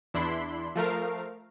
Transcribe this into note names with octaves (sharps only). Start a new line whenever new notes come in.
E2 D4 E4 B5 C6
F3 A3 A#4 F5